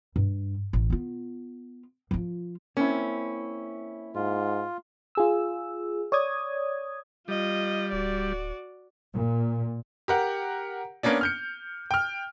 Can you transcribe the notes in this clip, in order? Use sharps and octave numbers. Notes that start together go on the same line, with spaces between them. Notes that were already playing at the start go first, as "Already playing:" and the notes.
G2
A1
B3 F4
F3 F4
A#3 C4 C#4 E4
G#2 F4
F4 G#4 E6
C#5 D5 D#6 G#6
G3 F4 D#5
D1 F#4 D5
A#2
G4 A#4 F#5
A#3 B3 C#4 D4
F6 G6 C#7
G5 F6